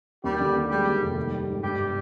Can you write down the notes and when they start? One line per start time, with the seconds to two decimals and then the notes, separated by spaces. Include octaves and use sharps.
0.24 D#2 G3 G4
0.40 D3
0.55 D#2
0.70 G3 G#3 G4
0.86 D#2
1.01 F1
1.16 D#4
1.33 G3
1.48 G#2
1.63 G1 G3 G4